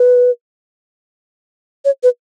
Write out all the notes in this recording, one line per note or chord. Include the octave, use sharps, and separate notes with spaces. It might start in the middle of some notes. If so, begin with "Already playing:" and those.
Already playing: B4
C#5
B4